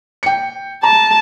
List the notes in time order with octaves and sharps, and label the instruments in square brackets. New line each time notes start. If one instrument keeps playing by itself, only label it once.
[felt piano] G5 C#7
[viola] A5 [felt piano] A#5